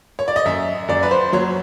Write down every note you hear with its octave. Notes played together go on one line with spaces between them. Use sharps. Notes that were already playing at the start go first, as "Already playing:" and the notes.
C#5
D5
D#5
F#2 E5
F#2 D5
B4
C5
F#3 C#5